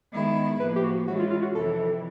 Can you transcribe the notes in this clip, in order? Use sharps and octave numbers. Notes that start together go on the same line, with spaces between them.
D#3 G#3 B3 E4
A2 F3 A#3 B4
G4
F#4
E3 G#3 C#4 F#4
F4
F4
F#4
F2 C3 E3 A4